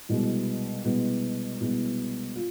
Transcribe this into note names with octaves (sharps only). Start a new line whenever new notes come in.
C2 B2 G#3 B3
C2 B2 G#3 B3
C2 B2 G#3 B3
F4